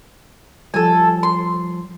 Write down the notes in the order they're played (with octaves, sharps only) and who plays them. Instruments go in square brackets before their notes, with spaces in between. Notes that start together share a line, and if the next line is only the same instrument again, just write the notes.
[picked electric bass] F3 G3 [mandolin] A4 G#5
[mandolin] C6